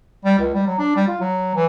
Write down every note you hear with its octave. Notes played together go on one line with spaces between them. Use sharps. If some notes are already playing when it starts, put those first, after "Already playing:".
G3
C#2
G3
F#3
D4
G3
F4
F#3
E3